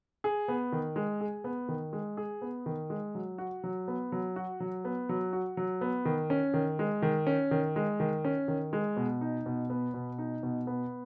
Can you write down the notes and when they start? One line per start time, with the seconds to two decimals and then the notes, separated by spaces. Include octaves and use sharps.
0.24 G#4
0.48 B3
0.72 D#3
0.96 G#3
1.21 G#4
1.44 B3
1.69 D#3
1.93 G#3
2.17 G#4
2.42 B3
2.66 D#3
2.90 G#3
3.15 F#3
3.38 F#4
3.64 F#3
3.88 B3
4.12 F#3
4.36 F#4
4.60 F#3
4.85 B3
5.09 F#3
5.33 F#4
5.57 F#3
5.81 B3
6.05 D#3
6.30 C#4
6.54 D#3
6.79 G#3
7.02 D#3
7.27 C#4
7.51 D#3
7.76 G#3
8.00 D#3
8.25 C#4
8.48 D#3
8.73 G#3
8.97 B2
9.21 D#4
9.46 B2
9.70 B3
9.94 B2
10.18 D#4
10.43 B2
10.67 B3